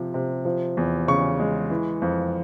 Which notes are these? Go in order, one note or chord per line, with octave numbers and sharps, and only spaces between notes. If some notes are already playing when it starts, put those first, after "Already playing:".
Already playing: C3 F3
C3
F3
E2
C#3 C#6
G#3
E3
F2